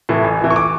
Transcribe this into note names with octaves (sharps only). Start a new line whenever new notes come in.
A2 E3
A1
A2 E3
C#6
D6